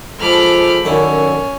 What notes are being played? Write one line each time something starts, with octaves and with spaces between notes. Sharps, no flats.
F3 G#3 A4 B5 D6 F6
F#2 D#3 C#4 E4 A4 D5